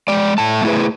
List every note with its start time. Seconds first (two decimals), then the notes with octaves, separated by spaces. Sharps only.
0.08 G#3 D5
0.38 A2 A3 A5
0.63 A3 E4 G#4 B4